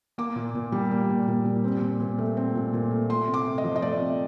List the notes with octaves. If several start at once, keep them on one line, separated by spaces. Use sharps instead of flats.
A#3 D6
A#2
A#2
G3
A#3
A#2
A#2
G3
C4
A#2
A#2
A3
C4
A#2
A#2
A3
A3 C6
C3
D6
C3
D#5
F3
D#5
A3 D5
C3